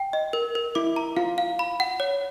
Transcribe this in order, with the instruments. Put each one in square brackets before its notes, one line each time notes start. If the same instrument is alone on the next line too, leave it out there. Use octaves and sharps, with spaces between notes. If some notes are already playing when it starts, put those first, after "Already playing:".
Already playing: [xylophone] G5
D#5
A#4
A#4
[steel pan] E4 [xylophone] D6
[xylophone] A#5
[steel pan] F4 [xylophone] F5
[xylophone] F5
B5
F#5
C#5